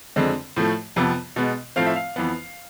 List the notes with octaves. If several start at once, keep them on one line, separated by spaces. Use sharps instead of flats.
F2 D3 G#3 C4
A2 F3 A3
F2 C3 F3 B3
B2 G#3 B3
A2 F3 A3 C4 F5
E5
F5
F2 E3 B3